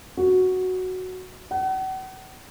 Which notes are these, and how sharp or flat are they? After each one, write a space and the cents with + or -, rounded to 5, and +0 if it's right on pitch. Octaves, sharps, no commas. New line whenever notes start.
F#4 +0
F#5 +40